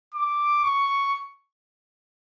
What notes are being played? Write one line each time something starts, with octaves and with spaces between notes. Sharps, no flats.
D6
C#6